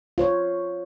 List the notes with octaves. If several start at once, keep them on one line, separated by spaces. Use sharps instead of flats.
F4 C5 C#5